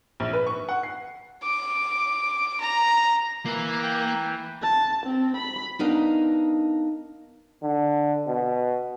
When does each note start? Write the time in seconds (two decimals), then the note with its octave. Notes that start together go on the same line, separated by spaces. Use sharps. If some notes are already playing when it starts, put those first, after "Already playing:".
0.20 A#1
0.33 B4
0.47 C#6
0.69 F#5
0.83 C7
1.43 D6
2.60 A#5
3.46 E3 A#3
3.83 G5
4.62 A5
5.06 C4
5.36 B5
5.79 B3 D4 D#4 A#4 D#5 F5
7.63 D3
8.27 B2